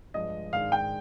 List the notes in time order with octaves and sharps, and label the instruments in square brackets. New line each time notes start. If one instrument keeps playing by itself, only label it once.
[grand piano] G2 F3 G#3 D4 [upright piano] D#5
[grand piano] G#2 D#3 G#3 D4 [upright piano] F5
[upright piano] G5